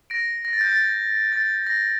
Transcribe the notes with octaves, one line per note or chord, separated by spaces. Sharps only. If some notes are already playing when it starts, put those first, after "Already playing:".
A#6 D7
A#6
A6
G6
A6
A6
A#6